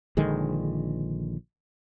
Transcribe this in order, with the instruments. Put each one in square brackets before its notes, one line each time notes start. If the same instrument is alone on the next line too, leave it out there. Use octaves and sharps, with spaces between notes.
[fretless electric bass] A#1 D3 D#3 G#3